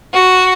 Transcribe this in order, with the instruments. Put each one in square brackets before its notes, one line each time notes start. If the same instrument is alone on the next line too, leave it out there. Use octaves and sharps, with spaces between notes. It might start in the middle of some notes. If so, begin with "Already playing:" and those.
[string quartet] F#4